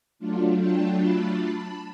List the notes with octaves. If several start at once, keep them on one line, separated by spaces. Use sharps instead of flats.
F#3 A3 D4 F4
G5 A5
A5 B5